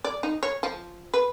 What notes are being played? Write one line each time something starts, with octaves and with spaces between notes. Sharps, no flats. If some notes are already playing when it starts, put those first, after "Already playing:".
D5
D#4
C#5
F3
B4